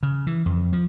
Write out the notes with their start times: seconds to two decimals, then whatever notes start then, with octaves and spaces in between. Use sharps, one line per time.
0.03 C#3
0.27 E3
0.46 F2
0.73 F3